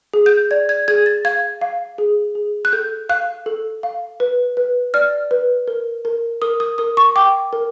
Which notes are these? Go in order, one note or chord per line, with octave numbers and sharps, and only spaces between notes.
G#4
G6
D5 G#6
G#6
G#4 G#6
A6
F5 G#6
F5
G#4
G#4
F#6
A4 G6
F5 F#6
A4
F5
B4
B4
D5 F6
B4
A#4
A#4
A#4 D#6
D#6
A#4 D#6
C#6
G5 D6
A#4